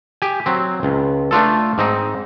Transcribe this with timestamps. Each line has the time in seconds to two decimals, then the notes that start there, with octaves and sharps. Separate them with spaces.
0.22 G4 G#5
0.46 F#3 C4
0.83 C#2
1.31 A3 D4 F4 A4
1.78 G#2 C4 D#4